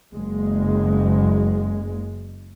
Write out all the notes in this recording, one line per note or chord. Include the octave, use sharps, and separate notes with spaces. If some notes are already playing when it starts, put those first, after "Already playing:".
F#1 G#3